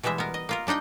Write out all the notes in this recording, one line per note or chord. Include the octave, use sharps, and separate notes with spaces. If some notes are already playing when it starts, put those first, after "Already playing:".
B2 E3 G3 G#3 E5
B3 A#4
D#5
A#3 F4 A#4
G3 D4 D#4 D#5 G5